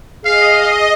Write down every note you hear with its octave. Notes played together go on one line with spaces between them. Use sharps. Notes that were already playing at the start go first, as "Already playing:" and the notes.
G#4 D#5 F5 C7